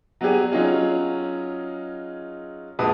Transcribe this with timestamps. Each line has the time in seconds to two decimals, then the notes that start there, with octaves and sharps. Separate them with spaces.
0.21 F#3 B3 D4 G4 G#4
0.52 F#3 C#4 D#4 F4 G#4
2.79 A#1 G#3 F#4 B4 A5 D#6